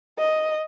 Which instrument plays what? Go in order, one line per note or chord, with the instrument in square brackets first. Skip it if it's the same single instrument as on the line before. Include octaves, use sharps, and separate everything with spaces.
[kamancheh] D#5